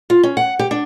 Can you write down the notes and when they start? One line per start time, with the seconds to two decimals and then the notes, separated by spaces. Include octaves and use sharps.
0.10 F4
0.23 C#4
0.37 F#5
0.59 G4
0.71 D4